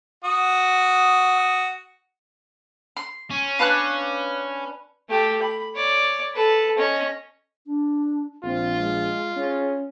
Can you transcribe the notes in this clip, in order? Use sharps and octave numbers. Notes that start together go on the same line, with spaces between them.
F#4 D#6
C6
C#4
D4 B4 D5 F5 A5 F#6
A3 G4
B5
C#5 D5
A4 B4
C#4 D#5
D4
A#1 C4 F4
G#3
C#4 G#4